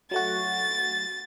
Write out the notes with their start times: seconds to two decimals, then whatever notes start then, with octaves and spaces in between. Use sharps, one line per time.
0.11 F#3 A3 F#4 A6